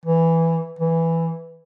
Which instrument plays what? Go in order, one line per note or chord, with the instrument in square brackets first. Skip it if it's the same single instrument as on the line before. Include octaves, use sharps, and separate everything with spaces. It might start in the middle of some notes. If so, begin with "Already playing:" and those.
[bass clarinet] E3
E3